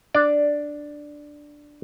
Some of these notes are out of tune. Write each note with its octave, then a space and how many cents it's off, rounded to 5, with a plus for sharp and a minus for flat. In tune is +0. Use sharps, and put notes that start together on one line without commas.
D4 +0 D5 +0